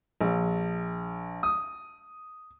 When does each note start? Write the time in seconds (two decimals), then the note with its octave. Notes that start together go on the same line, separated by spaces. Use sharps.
0.21 A#1
1.43 D#6